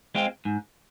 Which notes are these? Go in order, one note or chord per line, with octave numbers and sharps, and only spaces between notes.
G#3 C4 F4
G#2